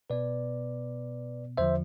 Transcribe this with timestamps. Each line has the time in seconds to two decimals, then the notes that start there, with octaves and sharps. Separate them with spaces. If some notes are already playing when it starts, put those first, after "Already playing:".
0.10 B2 B3 B4 D5
1.57 E2 D3 F3 C5 E5